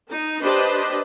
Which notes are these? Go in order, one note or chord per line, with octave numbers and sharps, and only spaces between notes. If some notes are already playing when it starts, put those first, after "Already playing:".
D#4
D4 G4 B4 C5 D#5